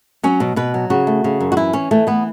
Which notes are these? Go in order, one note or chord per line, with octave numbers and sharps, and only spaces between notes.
F#3 C#4
B2
B2 B4
F#3
C#3 F#4
A3
C#3
F#2
F#4
E3 E4
E3 C#4
E3 A3
E3 B3